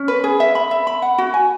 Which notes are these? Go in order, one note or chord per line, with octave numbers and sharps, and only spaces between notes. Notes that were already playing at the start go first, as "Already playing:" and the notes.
Already playing: C#4
B4
G#4
E5
B5
E5
B5
F#5
F#4
G#5